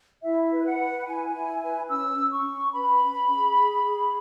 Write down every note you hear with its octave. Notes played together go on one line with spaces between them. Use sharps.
E4 E5
B4
F#5
B4
E4 G#5
E4
B4
C#4 E6
C#4
C#6
C#4
B4 B5
C#4
G#4
G#4
G#4